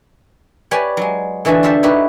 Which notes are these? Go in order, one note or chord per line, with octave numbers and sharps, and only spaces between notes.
G4 B4 C#5 D5 G#5
F#3 G#3
D3 E3 F#4 E5 A5
F4 G4 A4 C5 E5
D#4 E4 F#4 G4 B4